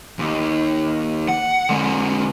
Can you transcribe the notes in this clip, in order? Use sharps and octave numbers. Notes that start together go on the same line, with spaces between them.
D#2
F#5
D3 G#3